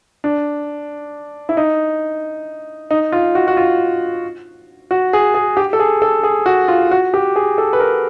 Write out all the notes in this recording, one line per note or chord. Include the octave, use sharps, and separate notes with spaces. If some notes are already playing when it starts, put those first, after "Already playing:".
D4
E4
D#4
D#4
F4
F#4
F#4
F4
F#4
G#4
G#4
G4
A4
G#4
A4
G#4
F#4
F4
F#4
G4
G#4
A4
B4
A#4